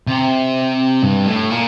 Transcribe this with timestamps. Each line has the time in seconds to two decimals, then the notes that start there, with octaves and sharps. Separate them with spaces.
0.07 C3
1.03 G2
1.27 A2
1.51 A#2